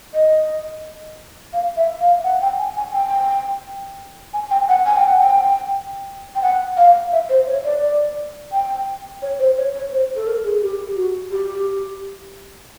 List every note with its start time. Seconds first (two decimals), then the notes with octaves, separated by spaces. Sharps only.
0.14 D#5
1.53 F5
1.77 E5
2.00 F5
2.24 F#5
2.42 G5
2.58 G#5
2.76 G#5
2.93 G5
4.34 G#5
4.51 G5
4.69 F#5
4.86 G#5
4.96 G5
5.08 F#5
5.20 G5
6.35 G5
6.42 F#5
6.77 F5
7.12 E5
7.29 C5
7.47 C#5
7.65 D5
8.52 G5
9.22 C#5
9.39 C5
9.58 C#5
9.75 C#5
9.92 C5
10.16 A4
10.27 A#4
10.44 G#4
10.62 G4
10.96 F#4
11.31 G4